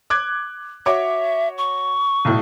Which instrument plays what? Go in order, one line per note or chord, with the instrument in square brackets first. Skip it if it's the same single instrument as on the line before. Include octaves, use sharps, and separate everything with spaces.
[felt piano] D6 F#6 G#6
[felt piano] F#4 C#5 D6 [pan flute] E5
[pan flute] C#6
[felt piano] B1 A2